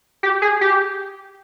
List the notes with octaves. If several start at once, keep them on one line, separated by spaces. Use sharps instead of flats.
G4
G#4
G4